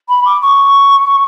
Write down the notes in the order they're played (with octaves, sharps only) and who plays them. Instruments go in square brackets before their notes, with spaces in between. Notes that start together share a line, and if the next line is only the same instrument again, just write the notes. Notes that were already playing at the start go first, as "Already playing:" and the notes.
[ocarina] B5
D6
C#6